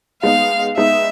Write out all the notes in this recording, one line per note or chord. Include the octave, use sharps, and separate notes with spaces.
G#3 B3 D#4 F5
G#3 B3 D#4 E5